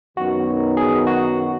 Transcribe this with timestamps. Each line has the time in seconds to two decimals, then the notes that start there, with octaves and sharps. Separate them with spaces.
0.17 F#2 D#3 F#3 B3 D#4 F#4
0.77 G#4
1.07 F#4